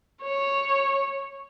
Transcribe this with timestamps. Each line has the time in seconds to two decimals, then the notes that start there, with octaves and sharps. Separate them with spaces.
0.23 C#5